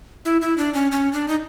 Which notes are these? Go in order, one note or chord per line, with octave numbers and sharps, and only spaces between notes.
E4
E4
D4
C#4
C#4
D4
D#4